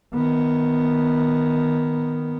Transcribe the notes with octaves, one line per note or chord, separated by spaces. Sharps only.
D#3 B3